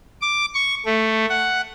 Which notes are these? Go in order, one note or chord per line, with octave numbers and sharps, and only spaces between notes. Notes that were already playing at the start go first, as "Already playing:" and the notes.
D6
C#6
A3
F#5